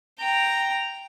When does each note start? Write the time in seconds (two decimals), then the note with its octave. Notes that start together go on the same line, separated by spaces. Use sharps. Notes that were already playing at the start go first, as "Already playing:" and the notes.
0.20 G5 A#5